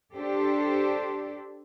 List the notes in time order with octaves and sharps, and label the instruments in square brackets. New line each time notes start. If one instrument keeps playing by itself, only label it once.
[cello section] D4 G4 A4 C5